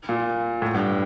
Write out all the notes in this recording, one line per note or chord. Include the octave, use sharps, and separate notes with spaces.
A#2
A2
G2